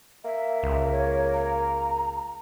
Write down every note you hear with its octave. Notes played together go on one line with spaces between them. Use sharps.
A#3 E5
C#2
C#5
A#5